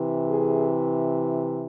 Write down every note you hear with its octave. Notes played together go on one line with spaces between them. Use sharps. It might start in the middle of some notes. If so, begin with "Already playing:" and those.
Already playing: C3 E3
G#4